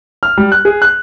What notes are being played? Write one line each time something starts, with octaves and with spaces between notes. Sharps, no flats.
F6
G3
F#6
G#4
F#6